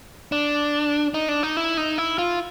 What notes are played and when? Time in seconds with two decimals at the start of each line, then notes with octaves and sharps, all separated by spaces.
0.32 D4
1.14 D#4
1.29 D4
1.43 D#4
1.57 E4
1.77 D#4
1.98 E4
2.18 F4